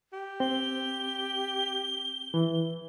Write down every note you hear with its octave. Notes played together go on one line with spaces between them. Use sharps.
G4
C4 G7
E3